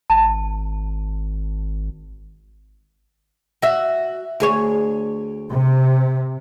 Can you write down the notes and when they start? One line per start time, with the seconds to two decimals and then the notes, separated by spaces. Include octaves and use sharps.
0.10 G#1 A5
3.62 F#4 E5
4.40 D2 G#4 C#5
5.51 C3